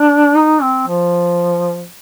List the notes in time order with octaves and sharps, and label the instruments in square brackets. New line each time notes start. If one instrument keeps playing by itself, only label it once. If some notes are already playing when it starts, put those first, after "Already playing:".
Already playing: [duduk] D4
D#4
C4
F3